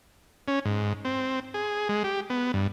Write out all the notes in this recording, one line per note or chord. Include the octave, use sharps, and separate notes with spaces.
C#4
G#2
C4
G#4
G#3
G4
B3
G2